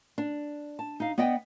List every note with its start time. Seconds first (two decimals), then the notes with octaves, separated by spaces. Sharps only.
0.18 D4
0.79 A5
1.00 D#4 F5
1.18 B3 D5 D#5 F#5 G5